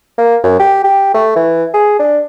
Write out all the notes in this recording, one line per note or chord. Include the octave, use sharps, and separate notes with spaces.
A#3
F#2
G4
G4
A3
E3
G#4
D4